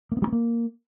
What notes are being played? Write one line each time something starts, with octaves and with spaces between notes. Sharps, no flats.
A#3
B3
G3
B3
A#3